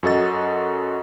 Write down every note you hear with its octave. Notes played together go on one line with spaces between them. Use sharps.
F#2 F#4 A4 D#5 A6